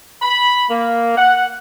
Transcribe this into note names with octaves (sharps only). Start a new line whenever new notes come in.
B5
A#3
F#5